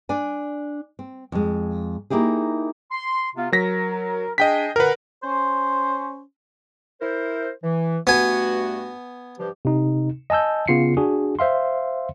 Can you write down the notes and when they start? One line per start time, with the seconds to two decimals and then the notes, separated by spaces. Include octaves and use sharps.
0.09 D4 D5 G#5
0.99 C4
1.32 F2 G#3
2.10 A#3 D#4 E4 G4 G#4
2.91 C6
3.36 C3 B3 F4
3.52 F#3 A#4 A#6 B6
4.38 D4 G#4 D#5 G5 B6
4.76 A#2 D3 A#4 B4 F#5
5.24 C#4 C5
7.01 E4 A#4 C5
7.63 E3
8.07 G2 A3 B3 F#4 G#5
9.38 G2 F3 G4
9.65 C3 D#4
10.30 D#5 G#5 A5 E6 G6
10.68 C#3 B3 F4 C7 C#7
10.97 D4 F#4 G#4
11.39 C5 E5 F5 C6